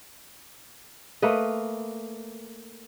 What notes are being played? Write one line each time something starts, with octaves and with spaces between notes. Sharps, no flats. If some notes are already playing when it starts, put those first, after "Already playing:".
A3 A#3 B4 D#5